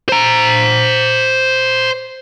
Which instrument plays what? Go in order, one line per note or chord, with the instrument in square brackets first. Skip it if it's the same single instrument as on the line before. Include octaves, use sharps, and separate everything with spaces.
[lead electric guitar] C5 A#5